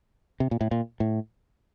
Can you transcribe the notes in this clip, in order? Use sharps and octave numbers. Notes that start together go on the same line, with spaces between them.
C3
A#2
A2
A#2
A2